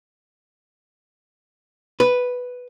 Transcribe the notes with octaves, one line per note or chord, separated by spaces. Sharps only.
B4